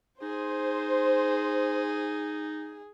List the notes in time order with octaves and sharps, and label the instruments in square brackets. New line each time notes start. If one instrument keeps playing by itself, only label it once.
[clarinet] D#4 [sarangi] G#4 [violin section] C5